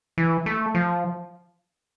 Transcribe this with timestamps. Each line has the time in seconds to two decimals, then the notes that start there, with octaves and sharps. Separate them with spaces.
0.18 E3
0.46 A3
0.74 F3